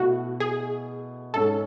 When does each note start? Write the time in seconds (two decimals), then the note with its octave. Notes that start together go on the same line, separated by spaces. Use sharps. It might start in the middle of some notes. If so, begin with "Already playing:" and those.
Already playing: B2 A3 E4 F#4
0.40 G#4
1.34 G#2 G#3 C#4 A4